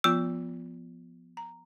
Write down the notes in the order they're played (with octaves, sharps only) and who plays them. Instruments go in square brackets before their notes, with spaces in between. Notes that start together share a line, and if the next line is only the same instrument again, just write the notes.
[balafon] F3 B3 F4 [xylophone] E6
[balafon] A#5